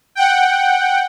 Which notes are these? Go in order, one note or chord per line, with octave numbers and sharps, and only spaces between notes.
F#5 G5